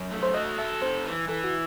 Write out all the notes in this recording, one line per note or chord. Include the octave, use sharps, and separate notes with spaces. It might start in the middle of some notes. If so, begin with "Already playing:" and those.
Already playing: F#2
A3
C5
F#4 D#5
A4 E5
C3 C5
E3
E3 A4
F#4